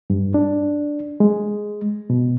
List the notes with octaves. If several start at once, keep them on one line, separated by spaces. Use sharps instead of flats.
G2
D4
G#3
B2